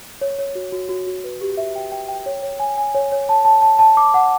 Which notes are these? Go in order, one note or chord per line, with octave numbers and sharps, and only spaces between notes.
C#5
C#5
F#4
F#4
F#4
F#4
B4
G4
E5
G5
G5
G5
C#5
C#5
G#5
G#5
C#5
C#5
A5
A5
A5
A5
D6
F#5